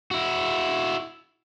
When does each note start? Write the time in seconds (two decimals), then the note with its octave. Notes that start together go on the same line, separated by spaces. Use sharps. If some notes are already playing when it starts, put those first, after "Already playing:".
0.11 E4 F#4